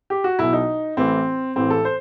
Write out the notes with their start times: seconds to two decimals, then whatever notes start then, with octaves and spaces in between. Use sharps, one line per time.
0.10 G4
0.24 F#4
0.39 B1 B2 E4
0.53 D#4
0.97 A1 A2 E3 C4
1.56 A1 A2 E3 C4
1.70 A4
1.85 C5